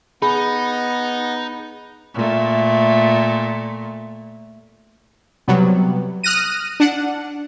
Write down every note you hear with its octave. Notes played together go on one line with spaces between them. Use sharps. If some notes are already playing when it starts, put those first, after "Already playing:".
B3 D#4 G#4 B5
A#2 A3
C3 F#3 G3 B3
D#6 F6 F#6 A#6 D#7
D4 F#5